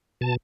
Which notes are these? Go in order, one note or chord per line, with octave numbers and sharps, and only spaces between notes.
B2 A5